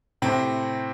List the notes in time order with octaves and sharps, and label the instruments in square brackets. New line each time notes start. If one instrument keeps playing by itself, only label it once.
[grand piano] A2 C3 C4